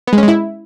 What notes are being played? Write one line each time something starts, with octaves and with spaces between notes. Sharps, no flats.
B3
G#3
C#4
G#3
E4